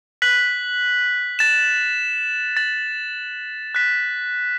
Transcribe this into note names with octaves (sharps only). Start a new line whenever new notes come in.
F#6 B6 F#7
A6 E7
A6 F#7
F#6 B6 E7